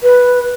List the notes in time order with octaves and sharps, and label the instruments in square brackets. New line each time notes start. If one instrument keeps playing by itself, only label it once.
[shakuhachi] B4